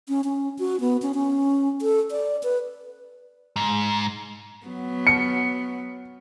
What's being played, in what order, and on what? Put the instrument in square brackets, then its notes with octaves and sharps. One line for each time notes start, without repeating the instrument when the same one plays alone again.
[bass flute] C#4
C#4
F#4
B3
C#4
C#4
A4
D5
B4
[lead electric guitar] G#2
[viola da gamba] F#3 B3
[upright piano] C#7